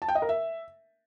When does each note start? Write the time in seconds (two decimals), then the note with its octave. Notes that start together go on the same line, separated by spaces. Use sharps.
0.02 A5
0.08 G5
0.15 D#5
0.22 A#4
0.29 E5